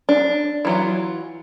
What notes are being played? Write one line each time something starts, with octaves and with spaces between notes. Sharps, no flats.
D4
E3 F#3 F4